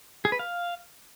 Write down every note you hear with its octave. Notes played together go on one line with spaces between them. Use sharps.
G#4
B4
F5